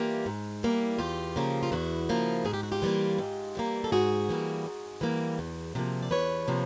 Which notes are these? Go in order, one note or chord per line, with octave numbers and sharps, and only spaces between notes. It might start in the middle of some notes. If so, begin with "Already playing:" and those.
Already playing: E3 G3 A#3 F4 G4
G#2
E3 G3 A#3
E2 F4 G4
C#3 F3 A#3
F4
E2 E4 F#4
C#3 F3 A#3
G#2 G#4
G4
F#4
F4 G4
E3 G3 A#3
G#2
E3 G3 A#3
A4
G#2 F#4 G#4
E3 G3 A#3
G#2
E3 G3 A#3
E2
C3 F3 A#3
D5
E2 B4 C#5
C3 F3 A#3